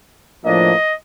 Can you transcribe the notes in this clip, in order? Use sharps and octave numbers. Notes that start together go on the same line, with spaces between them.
A2 F3 A#3 D4 D#5